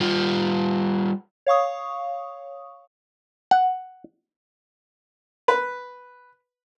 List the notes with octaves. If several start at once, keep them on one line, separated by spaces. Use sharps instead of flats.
G3 F4
C#5 F5 C#6 D#6
F#5
B4